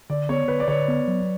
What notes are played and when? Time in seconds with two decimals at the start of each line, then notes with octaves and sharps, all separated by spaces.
0.10 D3 D5
0.29 B3 C#5
0.48 D3 B4
0.60 D5
0.68 D3 C#5
0.88 B3
1.08 F#3